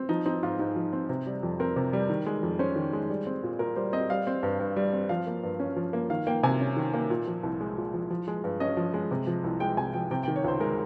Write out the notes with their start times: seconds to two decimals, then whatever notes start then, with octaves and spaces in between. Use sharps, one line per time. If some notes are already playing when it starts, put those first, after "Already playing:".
Already playing: C4
0.09 F3 D#4
0.26 C4 D#4
0.43 G#2 F4
0.59 G#2 D#4
0.76 F3
0.93 C4
1.09 C3
1.27 G3
1.43 F2
1.60 C4 A#4
1.76 C3
1.93 G3
2.10 D#3
2.26 G#3
2.43 F2
2.59 C#4 C5
2.76 D#3
2.93 G#3
3.10 G3
3.27 C4
3.43 A#2
3.59 A#2 A#4
3.76 G3 C5
3.93 C4 D#5
4.10 G3 F5
4.27 C4
4.43 G2
4.60 G2
4.76 G3
4.93 C4
5.09 F3 F5
5.27 A#3
5.43 G2
5.60 C#4
5.76 F3
5.93 A#3
6.10 D#3 F5
6.27 A#3 G5
6.43 C3 G#5
6.60 C#4
6.77 D#3
6.94 A#3
7.10 A#2
7.27 F3
7.43 C2
7.61 G#3
7.77 A#2
7.94 F3
8.10 F3
8.28 G#3
8.44 G2
8.60 C#4 D#5
8.77 F3
8.94 G#3
9.11 C3
9.27 F3
9.44 C2
9.60 G#3 G5
9.77 C3 G#5
9.93 F3 G5
10.11 C3 G5
10.23 G5
10.28 D#3
10.36 C#5
10.44 C#2 C5
10.60 G#3 A#4